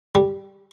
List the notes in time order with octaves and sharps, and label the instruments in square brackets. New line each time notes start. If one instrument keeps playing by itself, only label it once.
[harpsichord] G3